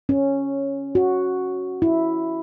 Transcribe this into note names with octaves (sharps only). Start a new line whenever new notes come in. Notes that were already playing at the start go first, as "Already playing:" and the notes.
C#4
F#4
E4